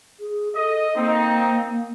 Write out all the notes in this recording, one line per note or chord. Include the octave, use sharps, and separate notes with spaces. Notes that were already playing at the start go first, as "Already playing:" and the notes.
G#4
A4 D#5
A#3 C4 D#4